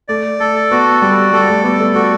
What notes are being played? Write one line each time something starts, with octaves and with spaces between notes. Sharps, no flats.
A3 D5
A3 A4
B3 F#4
G3 D5
G3 A4
A3
B3 D5
A3
A3 F#4